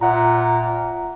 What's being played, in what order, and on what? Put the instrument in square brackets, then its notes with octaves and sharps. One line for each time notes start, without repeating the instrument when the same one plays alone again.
[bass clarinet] A#2 [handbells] E5 F#5 A#5